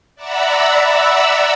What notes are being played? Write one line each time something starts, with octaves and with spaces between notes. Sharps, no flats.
D5 E5 F#5 A#5 B5 E6